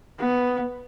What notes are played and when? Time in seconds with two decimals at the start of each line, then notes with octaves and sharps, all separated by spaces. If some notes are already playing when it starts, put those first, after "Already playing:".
0.19 B3